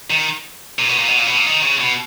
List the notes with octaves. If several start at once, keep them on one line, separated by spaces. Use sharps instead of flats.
D#3
A#2
B2
A#2
B2
A#2
B2
A#2
D#3
C#3
B2